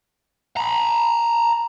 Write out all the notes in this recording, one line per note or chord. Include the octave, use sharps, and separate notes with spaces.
A#5 B5